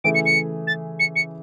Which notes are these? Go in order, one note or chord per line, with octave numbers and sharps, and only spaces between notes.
C#3 E3 A3 E4 G#4 D7
C#7
C#7
A6
C#7
C#7